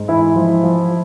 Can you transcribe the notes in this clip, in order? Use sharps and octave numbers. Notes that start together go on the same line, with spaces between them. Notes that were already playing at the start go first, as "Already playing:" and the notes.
Already playing: G#2
E3 E4
F3
F3